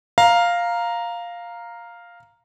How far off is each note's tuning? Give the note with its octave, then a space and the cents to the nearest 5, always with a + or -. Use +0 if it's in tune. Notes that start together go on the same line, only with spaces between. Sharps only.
F5 +0 A#5 +0